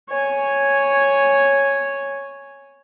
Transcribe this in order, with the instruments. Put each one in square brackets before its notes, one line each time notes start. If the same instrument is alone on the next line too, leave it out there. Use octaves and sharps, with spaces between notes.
[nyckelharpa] C#5 G#5